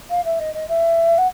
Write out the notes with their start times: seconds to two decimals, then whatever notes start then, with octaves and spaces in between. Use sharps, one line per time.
0.10 F5
0.25 E5
0.40 D#5
0.54 D#5
0.68 E5
1.18 F#5